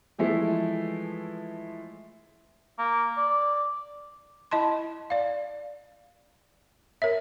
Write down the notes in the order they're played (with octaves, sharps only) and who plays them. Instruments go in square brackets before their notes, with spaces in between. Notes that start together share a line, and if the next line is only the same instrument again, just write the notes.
[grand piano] E3 F3 G#3 A3 E4
[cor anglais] A#3
D5
[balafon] E4 D#5 A5 C6
D5 F5
A#4 C#5 E5